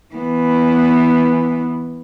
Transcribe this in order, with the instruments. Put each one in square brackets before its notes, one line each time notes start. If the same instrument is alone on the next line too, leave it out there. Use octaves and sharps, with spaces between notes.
[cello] E3 B3